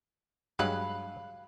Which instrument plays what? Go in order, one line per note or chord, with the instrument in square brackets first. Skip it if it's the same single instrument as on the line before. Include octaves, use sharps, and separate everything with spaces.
[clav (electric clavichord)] G2 F#3 G#3 [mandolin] F5 B5 F#6